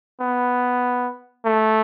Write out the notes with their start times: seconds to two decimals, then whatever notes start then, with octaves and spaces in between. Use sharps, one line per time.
0.20 B3
1.45 A3